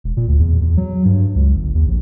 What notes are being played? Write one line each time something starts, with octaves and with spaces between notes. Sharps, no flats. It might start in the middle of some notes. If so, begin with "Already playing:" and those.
E1
A#2
D2
E2
E2
F#3
G2
C#2
G1
D#2
A#1